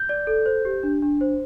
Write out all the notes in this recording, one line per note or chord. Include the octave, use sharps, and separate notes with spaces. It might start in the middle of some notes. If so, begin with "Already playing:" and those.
Already playing: G6
D5
A4
C5
G4
D4
D4
C5